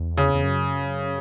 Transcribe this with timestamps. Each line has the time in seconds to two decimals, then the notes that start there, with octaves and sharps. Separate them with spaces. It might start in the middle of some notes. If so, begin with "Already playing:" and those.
Already playing: E2
0.17 C#3
0.34 E2
0.44 F#2